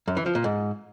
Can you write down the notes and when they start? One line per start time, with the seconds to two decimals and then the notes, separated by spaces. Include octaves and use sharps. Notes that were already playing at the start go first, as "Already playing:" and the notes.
0.08 F#2
0.17 E3
0.26 F3
0.35 A#2
0.44 G#2